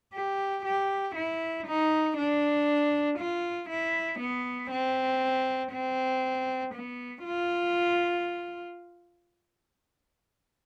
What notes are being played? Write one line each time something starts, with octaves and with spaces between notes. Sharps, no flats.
G4
G4
E4
D#4
D4
F4
E4
B3
C4
C4
B3
F4